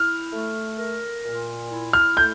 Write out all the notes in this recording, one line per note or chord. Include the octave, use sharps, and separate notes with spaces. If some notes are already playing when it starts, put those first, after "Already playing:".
Already playing: E4 F6
A3
A#4
A#2
E4
F6
A3 G6